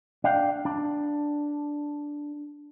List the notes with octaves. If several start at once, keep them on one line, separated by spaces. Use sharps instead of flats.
D4 F5 G5
D4